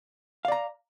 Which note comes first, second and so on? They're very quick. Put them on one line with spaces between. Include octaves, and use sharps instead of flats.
F5 D5 A#5